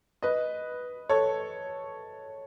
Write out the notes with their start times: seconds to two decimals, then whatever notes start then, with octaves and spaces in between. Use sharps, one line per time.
0.23 B4 D#5
1.09 A4 C#5